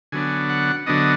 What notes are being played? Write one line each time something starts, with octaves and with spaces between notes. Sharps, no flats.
D3 F#3 B3 D4 G#5
F#5
D3 F#3 B3 D4 D#5